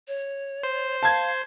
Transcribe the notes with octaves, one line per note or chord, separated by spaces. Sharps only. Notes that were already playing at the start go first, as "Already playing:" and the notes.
C#5
C5
F5 A5 G#6